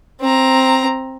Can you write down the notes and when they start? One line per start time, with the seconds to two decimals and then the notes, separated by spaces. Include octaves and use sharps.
0.21 C4 A#5